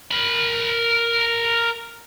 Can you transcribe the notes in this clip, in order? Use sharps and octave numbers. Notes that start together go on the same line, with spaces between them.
A#4 B5